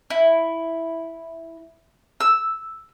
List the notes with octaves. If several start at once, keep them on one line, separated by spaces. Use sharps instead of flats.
E4
E6